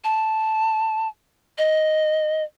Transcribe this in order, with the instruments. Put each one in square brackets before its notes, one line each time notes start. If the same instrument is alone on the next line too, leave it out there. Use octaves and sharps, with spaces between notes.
[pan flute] A5
D#5